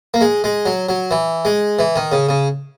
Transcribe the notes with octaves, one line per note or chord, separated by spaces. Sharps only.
A#3
G#3
G#3
F#3
F#3
E3
G#3
E3
D#3
C#3
C#3